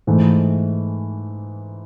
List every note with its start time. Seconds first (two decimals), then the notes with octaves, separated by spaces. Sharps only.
0.07 G#2 E3 A3